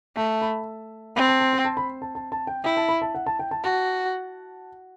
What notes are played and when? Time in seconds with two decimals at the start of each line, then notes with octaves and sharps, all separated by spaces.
0.16 A3 A5
0.42 B5
1.16 C4 B5
1.28 A5
1.40 A5
1.53 G5
1.65 A5
1.77 B5
2.02 A5
2.15 A5
2.32 A5
2.47 G5
2.64 E4 G5
2.77 A5
2.89 B5
3.02 A5
3.15 F#5
3.26 A5
3.39 G5
3.51 A5
3.64 F#4 A5